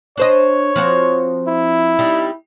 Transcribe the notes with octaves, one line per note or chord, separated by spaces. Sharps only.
D4 C5 C#5 D#5
F3 C4 F#4
E4
G3 D#4